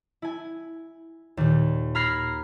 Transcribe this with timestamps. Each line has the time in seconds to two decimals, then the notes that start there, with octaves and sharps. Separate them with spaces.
0.22 E4 G#5
1.37 D#2 A#2
1.95 A#5 B5 F6 G#6 A#6 C7